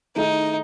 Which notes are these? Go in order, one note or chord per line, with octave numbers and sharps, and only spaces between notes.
D#3 A3 D#4 E4 G#4